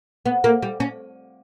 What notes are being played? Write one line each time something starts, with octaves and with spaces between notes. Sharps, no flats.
B3
A#3
G3
C#4